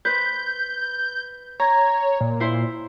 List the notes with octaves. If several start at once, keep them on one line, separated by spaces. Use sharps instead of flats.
B4 C5 G6
C#5 A#5
A#2
E4 C5 C6